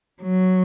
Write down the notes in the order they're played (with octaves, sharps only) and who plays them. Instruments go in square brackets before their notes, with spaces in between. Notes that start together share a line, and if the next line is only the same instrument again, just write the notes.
[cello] F#3